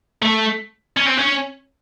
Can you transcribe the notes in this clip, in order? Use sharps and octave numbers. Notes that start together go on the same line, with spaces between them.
A3
C#4
C4
C#4